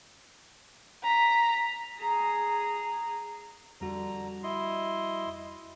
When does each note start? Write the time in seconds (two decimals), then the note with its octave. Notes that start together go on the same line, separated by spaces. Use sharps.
1.03 A#5 B6
1.99 G#4 A#5
3.81 F2 D3 G3 F#4 A#5
4.43 E4 D#5 C6